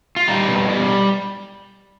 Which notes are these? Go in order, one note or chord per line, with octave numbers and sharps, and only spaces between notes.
F4
G3 D#4
B2
G3